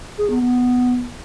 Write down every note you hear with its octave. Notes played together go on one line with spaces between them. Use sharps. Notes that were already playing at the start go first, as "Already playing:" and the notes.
G#4
B3
B3